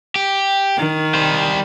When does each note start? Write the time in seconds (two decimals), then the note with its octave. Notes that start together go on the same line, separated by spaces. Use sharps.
0.16 G4
0.78 D#3
1.14 G3 C5